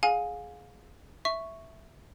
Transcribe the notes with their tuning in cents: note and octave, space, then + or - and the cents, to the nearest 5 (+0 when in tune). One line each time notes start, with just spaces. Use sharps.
G#4 +15 F5 +25 G#5 -5
E5 +0 C#6 +0